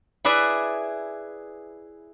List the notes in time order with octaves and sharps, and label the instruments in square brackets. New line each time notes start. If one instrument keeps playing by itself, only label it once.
[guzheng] E4 G#4 B4 D5 E5